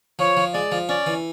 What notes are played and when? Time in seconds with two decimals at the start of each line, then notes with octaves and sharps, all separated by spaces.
0.19 F3 C#5
0.37 F3
0.54 G#3 D5
0.72 F3
0.89 C#4 D5
1.06 E3